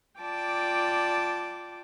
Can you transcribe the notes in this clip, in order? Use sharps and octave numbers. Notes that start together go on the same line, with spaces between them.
F4 D5 G5 A5 D6